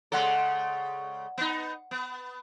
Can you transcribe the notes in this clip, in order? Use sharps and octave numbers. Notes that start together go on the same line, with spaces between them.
C#3 G#3 A4 D5 F#5 C6
B3 D#4
B3